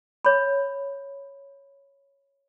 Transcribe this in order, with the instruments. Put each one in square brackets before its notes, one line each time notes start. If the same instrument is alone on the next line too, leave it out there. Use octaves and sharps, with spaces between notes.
[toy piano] C#5 B5